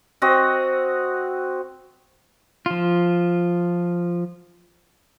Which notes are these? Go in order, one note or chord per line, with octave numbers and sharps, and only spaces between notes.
C4 F#4 D#5
F3 F4